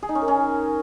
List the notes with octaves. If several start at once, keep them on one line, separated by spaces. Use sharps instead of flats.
G#4
D#4
C#4
A#4
C#4